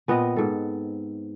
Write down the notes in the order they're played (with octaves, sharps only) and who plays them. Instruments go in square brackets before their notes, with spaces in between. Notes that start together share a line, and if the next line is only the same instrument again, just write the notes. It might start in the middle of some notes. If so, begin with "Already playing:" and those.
[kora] A#2 B3 C4 D#5
G#2 A4